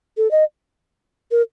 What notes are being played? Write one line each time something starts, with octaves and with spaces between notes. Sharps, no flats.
A4
D#5
A#4